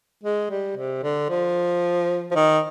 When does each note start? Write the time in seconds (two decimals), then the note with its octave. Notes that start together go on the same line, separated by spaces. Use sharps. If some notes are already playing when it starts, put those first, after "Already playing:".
0.24 G#3
0.50 G3
0.77 C3
1.03 D3
1.30 F3
2.31 F3
2.35 D#3